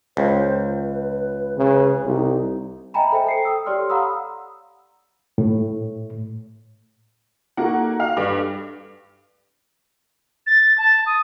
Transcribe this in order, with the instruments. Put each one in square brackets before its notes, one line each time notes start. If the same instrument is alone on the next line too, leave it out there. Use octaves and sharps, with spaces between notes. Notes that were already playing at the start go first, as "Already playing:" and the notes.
[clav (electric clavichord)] C#2 [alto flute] C5
[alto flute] B4
[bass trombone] C#3 [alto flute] B4
[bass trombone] C2 [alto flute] D#4
[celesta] D#5 E5 G5 G#5 A#5 B5
A4 C5 E5 G5
A4 C7 C#7
G5 D#6 E6
G4 A4 C#5 D5 C6 F6
F5 F#5 A#5 B5 D#6 E6
[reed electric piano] A2
[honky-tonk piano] A#3 F#5 [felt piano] D#4 F#4 A4
[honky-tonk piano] F5
[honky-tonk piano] G2 [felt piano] A4 B4 D6
[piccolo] A6
A5
D#6